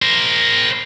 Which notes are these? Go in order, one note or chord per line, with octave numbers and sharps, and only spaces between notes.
A#4 C5